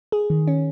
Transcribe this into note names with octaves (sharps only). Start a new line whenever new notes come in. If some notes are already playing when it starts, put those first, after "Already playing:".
G#4
D#3
C#4